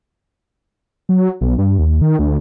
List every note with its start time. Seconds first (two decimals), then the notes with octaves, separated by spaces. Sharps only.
1.09 F#3
1.41 B1
1.58 G2
1.79 D#2
2.02 D#3
2.19 D2